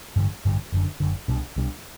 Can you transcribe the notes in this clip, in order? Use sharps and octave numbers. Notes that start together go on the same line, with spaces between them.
A1 G2 D3 G3
A1 G2 D3 G3
F#1 F#2 D3
F#1 F#2 D3
C2 B2 G3 D4
C2 B2 G3 D4